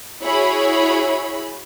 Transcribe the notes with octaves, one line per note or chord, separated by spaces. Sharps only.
E4 F#4 G#4 C#5 B5